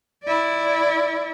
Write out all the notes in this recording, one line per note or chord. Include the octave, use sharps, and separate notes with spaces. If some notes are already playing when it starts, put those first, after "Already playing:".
E4 D5